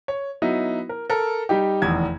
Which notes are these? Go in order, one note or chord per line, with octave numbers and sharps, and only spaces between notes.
C#5
F#3 B3 D#4 E4
A#4
A4 A#4
G3 D#4 G4
F1 E2 D#3 G#6